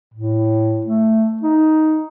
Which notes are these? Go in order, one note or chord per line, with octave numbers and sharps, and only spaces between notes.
A2
A3
D#4